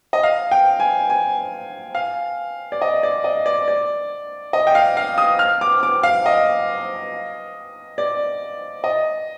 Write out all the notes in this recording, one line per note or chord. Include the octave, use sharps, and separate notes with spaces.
D#5
F5
G5
G#5
G#5
F5
D5
D#5
D5
D#5
D5
D5
D#5
G5
F5
F5
D#6
F6
D6
D6
F5
D#5
D5
D#5